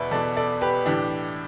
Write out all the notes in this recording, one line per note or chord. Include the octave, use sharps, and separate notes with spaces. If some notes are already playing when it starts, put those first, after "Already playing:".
Already playing: E2 B2 B4 D5 E5
E2 B2 A4 D5
A4 D5
G4 B4
A2 E3 D4 G4